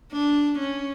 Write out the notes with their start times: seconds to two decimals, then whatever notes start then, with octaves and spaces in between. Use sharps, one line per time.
0.12 D4
0.59 C#4